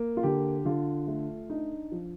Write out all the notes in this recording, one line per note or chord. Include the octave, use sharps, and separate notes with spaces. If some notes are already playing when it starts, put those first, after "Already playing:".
Already playing: A#3
F4
D3 G4
D3 F4
A3
D4 D#4
F3